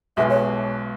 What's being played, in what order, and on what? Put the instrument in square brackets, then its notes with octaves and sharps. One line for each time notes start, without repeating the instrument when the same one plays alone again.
[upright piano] B1 B2 G#3 B3 F#4 [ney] E5
[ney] C#5